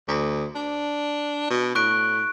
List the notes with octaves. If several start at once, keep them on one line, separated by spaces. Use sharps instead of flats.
D2
D4
B2
A2 C#6 F#6 D7